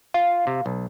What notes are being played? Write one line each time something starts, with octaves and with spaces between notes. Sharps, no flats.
F4 F5
C3
B1